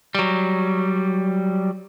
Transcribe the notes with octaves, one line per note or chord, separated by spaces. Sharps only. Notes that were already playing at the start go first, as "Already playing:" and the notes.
F#3 G3